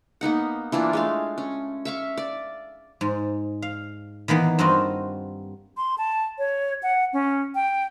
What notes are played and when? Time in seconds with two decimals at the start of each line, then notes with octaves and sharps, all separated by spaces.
0.21 A#3 B3 D#4 F#5
0.72 E3 A#3 D4 F4
0.93 G#3 A3 F5
1.38 C#4
1.85 E5 F5 C#6
2.17 D5
3.01 G#2
3.62 F5
4.28 D#3 E3 A#3 B3
4.59 G2 C4 F4 F#4 D#5
5.77 C6
5.98 A5
6.38 C#5
6.83 F#5
7.13 C#4
7.55 G5